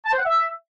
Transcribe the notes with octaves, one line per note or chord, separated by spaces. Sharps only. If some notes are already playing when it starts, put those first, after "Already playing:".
A5
C5
F#5
E5